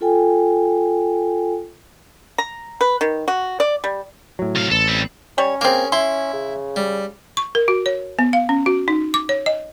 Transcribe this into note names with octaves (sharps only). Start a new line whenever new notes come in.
F4 A4 G5 G#5
A#5
B4
D#3
F#4
D5
G3
A2 F#3
C2 F5
A1 A4
G3 C4
G3 C#4 C#5
A#3 C4 G#4 A#4
E4 C6
C#3
G3
C#6
A#4
F#4
C#5
B3
F5
C#4
F#4
D#4
D6
C#5
D#5